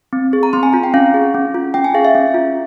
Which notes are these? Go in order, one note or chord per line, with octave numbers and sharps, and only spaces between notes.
C4
G#4
A#5
C4 C6
G#5
F4 A#5
G5
C#4 F5
G#4
C#4
F4
C#4 G5
G#5
G#4 F5
E5
C#4
F4